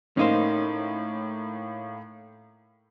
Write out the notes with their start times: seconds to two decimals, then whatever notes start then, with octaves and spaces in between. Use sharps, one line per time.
0.17 A2 A#3 C#4 D#4 C5